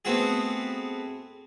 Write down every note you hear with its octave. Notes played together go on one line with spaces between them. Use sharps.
A3 B3 C4 F#4 G#4